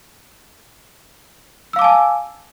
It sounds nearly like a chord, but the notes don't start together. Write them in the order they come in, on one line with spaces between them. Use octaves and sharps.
E6 F5 D6 A5 G#5